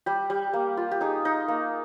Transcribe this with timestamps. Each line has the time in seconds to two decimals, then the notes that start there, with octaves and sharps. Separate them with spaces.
0.06 G3 G4
0.30 G3
0.53 A#3
0.77 F4
0.91 G4
1.01 D#4 G#4
1.25 D#4
1.48 A#3